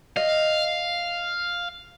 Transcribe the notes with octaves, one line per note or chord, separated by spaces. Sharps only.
D#5 F5